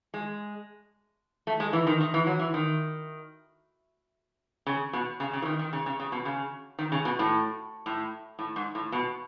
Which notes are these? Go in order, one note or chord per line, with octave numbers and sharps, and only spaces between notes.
G#3
A3
G#3
E3
D#3
D#3
E3
F#3
E3
D#3
C#3
B2
C#3
C#3
E3
D#3
D#3
C#3
C#3
C#3
B2
C#3
D#3
C#3
B2
A2
A2
A2
G#2
A2
B2